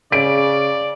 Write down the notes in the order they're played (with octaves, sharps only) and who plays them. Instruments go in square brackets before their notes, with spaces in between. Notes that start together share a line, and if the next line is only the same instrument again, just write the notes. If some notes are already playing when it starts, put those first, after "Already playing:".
[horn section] C#3 [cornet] D5 [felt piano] D7